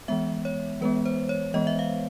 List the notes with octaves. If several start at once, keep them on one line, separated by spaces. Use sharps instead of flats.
E3 G#3 B3 E5
C#5
E3 G#3 B3 B4
C5
C#5
E3 G#3 B3 D#5
E5
F5